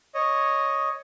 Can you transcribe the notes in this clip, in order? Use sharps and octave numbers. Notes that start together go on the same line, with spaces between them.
C#5 D#5